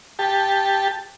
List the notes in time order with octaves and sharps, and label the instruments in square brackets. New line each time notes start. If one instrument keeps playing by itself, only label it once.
[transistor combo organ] G4 A5